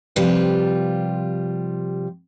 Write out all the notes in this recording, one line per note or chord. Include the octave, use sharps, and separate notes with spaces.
C3 F3 G3 F4 G4 B4